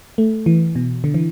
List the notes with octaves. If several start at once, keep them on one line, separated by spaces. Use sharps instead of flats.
A3
E3
B2
D3
E3